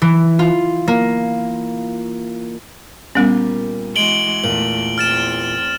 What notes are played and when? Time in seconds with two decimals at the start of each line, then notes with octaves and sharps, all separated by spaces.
0.02 E3
0.39 F4
0.88 A#3
3.15 A#2 G3 A#3 B3 C#4
3.96 E3 G#3 F#4 D7 F#7 G7
4.44 E2 A#2 A3 F#7
4.98 E2 C4 F6 A6 E7